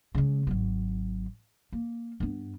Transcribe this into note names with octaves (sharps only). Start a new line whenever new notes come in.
C#3 G#3
G#1 F#3
A#3
G2 B3